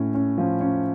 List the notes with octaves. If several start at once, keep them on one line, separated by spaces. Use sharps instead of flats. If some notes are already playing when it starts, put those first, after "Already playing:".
Already playing: A2 C#4
C#4
F3
C#4